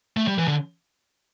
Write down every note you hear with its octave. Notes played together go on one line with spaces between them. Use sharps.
A3
G3
E3
D3